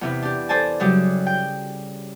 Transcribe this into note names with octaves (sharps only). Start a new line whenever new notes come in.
E2 C3 E4
D4 G4
A4 C5 D5 G#5 A5
F#2 C#3 F#3 G3 G4
G5